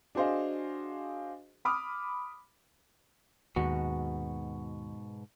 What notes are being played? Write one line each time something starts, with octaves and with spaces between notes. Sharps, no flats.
D4 F#4 G#4 C5 D#5 F5
B5 D6 D#6 F6
D#2 G#2 B2 F#4